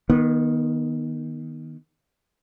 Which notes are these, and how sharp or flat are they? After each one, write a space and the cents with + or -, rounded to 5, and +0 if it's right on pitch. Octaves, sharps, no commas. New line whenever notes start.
D#3 +0 B3 -35